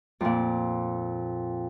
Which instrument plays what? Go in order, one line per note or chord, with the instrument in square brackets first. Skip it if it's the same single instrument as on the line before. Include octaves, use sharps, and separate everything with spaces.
[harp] F2 A#2